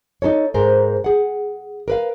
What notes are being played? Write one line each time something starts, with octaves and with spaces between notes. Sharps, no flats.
D#4 E4 A4 C#5
G#2 G#4 A#4 C5
G#4 F#5
A#4 B4 F5